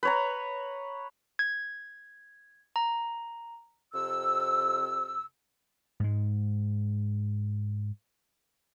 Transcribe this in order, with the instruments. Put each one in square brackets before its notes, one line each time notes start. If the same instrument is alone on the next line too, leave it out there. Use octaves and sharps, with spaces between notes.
[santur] B4 C#5 A#5
[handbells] G#6
A#5
[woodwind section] F2 C3 E6
[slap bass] G#2 G#3